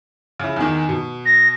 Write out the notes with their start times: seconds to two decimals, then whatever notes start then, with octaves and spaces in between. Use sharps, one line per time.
0.40 C#3 E4
0.56 E2 D#3
0.89 B2
1.26 A#6